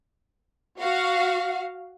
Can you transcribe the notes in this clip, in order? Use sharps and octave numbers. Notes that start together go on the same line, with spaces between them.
F#4 F5